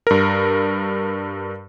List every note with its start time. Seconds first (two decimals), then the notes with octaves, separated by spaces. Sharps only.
0.07 G2 A#4